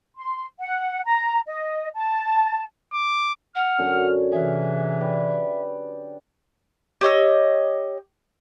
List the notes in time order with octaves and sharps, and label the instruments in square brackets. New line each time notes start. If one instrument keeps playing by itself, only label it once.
[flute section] C6
F#5
A#5
D#5
A5
[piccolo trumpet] D6
[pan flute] F#5 [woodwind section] F6
[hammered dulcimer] F#2 D3 C#4
[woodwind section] C3 E3 [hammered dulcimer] G#4 F5 [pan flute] E5
[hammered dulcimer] G4 B4 D5
[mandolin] G4 C#5 D#5 E6